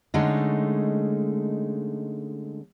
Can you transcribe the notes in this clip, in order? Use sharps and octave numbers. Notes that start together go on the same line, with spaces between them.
D3 G#3 A3 C#4 D#4